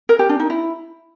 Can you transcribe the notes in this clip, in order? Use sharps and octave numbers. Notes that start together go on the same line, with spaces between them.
A#4
G4
D4
D#4
E4